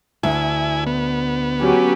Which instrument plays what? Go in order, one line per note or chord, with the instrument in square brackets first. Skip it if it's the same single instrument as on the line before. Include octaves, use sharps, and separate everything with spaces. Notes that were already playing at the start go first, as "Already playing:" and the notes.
[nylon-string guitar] D2 [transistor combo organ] E4 G#5
[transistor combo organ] B3
[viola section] F#3 C#4 G4